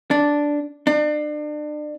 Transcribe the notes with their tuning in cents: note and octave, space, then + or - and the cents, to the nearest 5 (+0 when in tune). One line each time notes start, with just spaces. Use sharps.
D4 -5
D4 +35